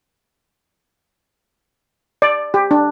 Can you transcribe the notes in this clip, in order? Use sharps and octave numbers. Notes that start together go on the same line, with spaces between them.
D5
G4
D4